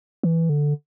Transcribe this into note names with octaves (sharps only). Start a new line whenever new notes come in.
E3
D3